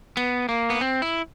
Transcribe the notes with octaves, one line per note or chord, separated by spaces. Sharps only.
B3
A#3
B3
C4
E4